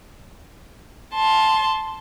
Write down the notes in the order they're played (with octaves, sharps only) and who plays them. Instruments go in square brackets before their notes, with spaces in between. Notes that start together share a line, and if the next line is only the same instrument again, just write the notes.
[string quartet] A5 C6